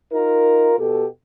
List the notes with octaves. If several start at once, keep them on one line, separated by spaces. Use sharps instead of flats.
D#4 F4 A#4
B2 G4 A4